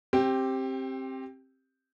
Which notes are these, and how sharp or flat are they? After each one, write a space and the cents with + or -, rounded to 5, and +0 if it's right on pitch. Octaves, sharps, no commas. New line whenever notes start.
C4 +20 G4 +0